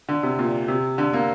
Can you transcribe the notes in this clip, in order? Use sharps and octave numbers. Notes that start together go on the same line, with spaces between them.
D3
C3
A#2
C3
D3
A#3